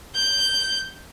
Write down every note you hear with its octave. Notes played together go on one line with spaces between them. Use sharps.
G6